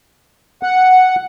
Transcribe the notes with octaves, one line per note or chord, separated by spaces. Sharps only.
F#5